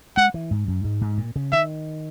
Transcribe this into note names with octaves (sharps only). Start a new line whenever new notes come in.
G#3 F#5
E3
G#2
F#2
G#2
G#2
A#2
C#3
D#3 E5